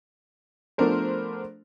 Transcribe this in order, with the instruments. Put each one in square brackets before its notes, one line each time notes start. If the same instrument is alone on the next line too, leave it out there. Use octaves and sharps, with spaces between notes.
[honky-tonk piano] F3 A3 B3 D4 A#4 C5